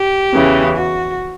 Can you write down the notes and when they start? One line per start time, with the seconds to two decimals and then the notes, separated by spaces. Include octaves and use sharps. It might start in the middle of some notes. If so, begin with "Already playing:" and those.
Already playing: G4
0.34 E2 C#3 E3
0.76 F#4